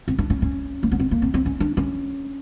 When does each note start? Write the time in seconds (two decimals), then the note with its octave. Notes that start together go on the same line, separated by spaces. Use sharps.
0.08 C4
0.19 D4
0.30 C#4
0.42 C#4
0.83 A#3
0.92 B3
1.00 C4
1.11 A#3
1.22 C4
1.34 C4
1.46 C#4
1.60 D4
1.77 C#4